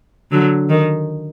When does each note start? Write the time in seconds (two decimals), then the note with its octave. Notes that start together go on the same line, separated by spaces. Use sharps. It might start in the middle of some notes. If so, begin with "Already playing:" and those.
0.31 D3 F#3
0.69 D#3